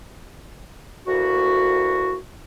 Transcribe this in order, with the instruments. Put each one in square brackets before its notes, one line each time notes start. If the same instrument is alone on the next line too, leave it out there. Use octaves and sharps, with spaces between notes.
[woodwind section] D2 A#3 E4 F#4